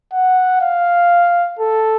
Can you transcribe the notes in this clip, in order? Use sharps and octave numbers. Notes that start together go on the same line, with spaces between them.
F#5
F5
A4